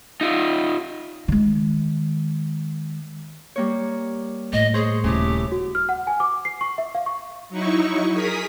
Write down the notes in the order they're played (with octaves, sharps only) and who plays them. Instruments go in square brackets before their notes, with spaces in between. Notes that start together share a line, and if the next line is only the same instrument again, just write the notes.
[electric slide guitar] D#4 F4
[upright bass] D#3 G#3
[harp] G3 A#3 C#5
[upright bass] A2 [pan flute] D#5
[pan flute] G#4 [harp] C5 C#5 C6
[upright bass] D#1 [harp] C#3 A3 E4 [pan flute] G4
[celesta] F#4
F6
F#5
G#5
D6
C7
C#6
E5
F5
C#6
[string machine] F#3 D#4 E4 C#6
G#4 A#4 D#6 B6